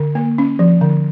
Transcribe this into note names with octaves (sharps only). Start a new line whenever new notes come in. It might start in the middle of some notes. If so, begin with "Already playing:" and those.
Already playing: D3
A#3
C#4
F3
D3